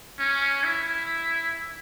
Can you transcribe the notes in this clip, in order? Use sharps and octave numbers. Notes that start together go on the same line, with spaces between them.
C#4
E4